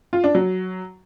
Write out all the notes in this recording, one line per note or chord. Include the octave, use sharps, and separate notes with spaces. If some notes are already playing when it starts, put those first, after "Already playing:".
F4
D4
F#3